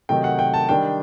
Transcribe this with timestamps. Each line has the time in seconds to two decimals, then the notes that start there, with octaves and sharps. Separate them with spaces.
0.09 C3 D#3 F#3 A3 D#4 G5
0.24 F#5
0.39 G5
0.54 A5
0.69 D#3 G3 D4 G5